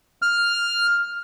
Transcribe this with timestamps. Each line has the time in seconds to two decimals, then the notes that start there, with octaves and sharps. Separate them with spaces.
0.22 F6